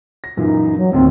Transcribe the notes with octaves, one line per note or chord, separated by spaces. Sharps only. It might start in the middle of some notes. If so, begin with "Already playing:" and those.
A#6
F#2 A#2 E3 D#4
F#3
D1 D#2 C4